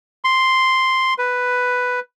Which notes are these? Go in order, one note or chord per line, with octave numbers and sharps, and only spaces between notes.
C6
B4